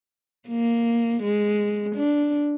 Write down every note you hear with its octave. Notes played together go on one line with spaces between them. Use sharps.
A#3
G#3
D4